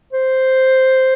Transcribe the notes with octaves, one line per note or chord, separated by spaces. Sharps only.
C5